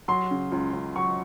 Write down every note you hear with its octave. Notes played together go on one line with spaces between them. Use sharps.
F#3 C6
C#3
C#2
C#2
F#3 C#6